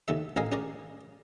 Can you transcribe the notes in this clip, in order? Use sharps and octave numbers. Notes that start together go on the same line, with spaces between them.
D#2 D#3 A4 E5
A1 A4 A#4 D#5 F5 G#5
C#4 G#4 A#4 D5